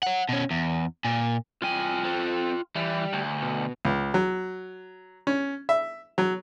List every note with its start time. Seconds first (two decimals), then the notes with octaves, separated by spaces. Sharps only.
0.03 C#5 F#5
0.29 B2 C#4
0.51 E2
1.05 A#2
1.62 C2 F4 G5 G#5
2.05 C4 A4
2.76 E3 G3
3.13 D2
3.42 B2
3.85 C#2
4.14 F#3
5.27 C#4
5.69 E5
6.18 F#3